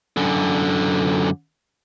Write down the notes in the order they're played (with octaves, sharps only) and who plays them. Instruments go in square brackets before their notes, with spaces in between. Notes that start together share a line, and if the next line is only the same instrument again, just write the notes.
[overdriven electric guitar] F#2 D3